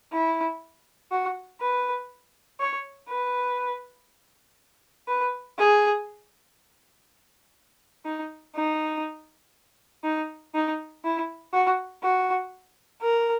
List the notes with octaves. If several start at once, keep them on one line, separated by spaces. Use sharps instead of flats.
E4
F#4
B4
C#5
B4
B4
G#4
D#4
D#4
D#4
D#4
E4
F#4
F#4
A#4